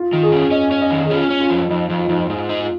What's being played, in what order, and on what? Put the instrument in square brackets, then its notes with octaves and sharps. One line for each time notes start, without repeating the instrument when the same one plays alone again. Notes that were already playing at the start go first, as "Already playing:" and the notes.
Already playing: [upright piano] F4
[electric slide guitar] D#3 [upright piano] F4
[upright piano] G#4
[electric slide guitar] C#4
[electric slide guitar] C#4 [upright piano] D#5
[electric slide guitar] C#4
[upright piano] D#5
[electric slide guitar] D#3
[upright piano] G#4
[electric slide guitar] C#4 [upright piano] F4
[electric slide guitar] C#4
[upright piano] F4
[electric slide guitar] F2
[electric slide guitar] F2 [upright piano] D#4
[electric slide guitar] F2
[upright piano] F4
[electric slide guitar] F2 [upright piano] D#4
[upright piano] F4
[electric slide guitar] G#2 [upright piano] F4
[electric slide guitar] D#4
[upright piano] F4